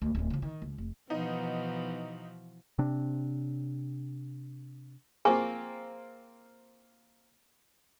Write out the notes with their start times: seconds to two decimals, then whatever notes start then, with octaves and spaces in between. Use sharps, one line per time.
0.02 D2
0.15 D1 C#4
0.30 C#3 F3
0.42 D#3
0.62 C#2
0.78 F1
1.10 B2 E3 F3 B3 D#4
2.79 C3 C4 D4
5.25 A#3 C4 F4 G#4 G#5 C#6